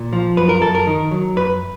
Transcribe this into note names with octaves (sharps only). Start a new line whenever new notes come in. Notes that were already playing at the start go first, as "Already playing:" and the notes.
Already playing: A#2
F3
F#2 B4
A#4
F#2 A4
A#4
D#3
F#3
F#2 B4